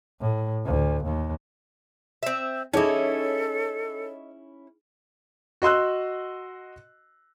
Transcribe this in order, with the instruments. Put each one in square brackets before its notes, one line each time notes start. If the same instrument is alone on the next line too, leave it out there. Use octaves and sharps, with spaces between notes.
[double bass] A2
D2
D#2
[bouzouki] C4 E5
[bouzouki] C#4 E4 [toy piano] D#4 G#4 E5 [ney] A4 [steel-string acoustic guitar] C#5 D#5
[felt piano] F#4 D#5 C6 E6 F#6